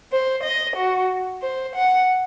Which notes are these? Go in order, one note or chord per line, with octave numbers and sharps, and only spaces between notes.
C5
D#5
F#4
C5
F#5